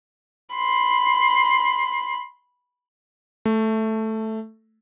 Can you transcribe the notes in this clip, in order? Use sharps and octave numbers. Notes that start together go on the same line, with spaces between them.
B5 C6
A3